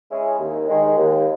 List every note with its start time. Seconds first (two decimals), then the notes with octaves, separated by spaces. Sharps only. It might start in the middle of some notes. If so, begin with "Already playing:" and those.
0.10 G#3 C#4 E4 G#4
0.39 D#2
0.68 D#3 G#3
0.97 D#2